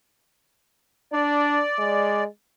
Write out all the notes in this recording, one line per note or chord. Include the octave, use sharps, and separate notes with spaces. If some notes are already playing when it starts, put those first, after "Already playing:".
D4 D5
G#3